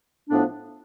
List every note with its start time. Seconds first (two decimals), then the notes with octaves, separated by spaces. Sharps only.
0.28 A2 F3 B3 D4